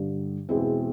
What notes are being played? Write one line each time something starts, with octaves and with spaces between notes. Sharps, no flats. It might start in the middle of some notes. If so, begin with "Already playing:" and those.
Already playing: G2 D3 G3
E2 B2 G#3 C4 E4